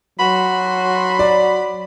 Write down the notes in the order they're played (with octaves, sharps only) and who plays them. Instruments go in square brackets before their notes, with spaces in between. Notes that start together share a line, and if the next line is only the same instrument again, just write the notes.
[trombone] F#3 [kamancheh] F#4 C6 [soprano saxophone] B5
[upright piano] D5